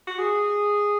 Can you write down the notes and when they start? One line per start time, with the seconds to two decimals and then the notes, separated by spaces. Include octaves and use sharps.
0.07 F#4
0.18 G#4